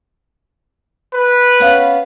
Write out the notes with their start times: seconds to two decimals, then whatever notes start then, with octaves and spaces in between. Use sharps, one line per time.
1.14 B4
1.60 B3 C#4 F5